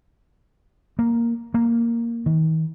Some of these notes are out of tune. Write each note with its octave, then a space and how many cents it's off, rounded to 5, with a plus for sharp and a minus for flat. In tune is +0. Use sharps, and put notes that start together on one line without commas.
A#3 +0
A#3 -5
D#3 +40